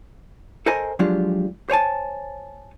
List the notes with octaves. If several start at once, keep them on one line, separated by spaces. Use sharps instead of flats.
A4 A#4 C5 D#5 G#5 A#5
F3 F#3 G#3 D4 F4 G4
C5 C#5 G#5 A5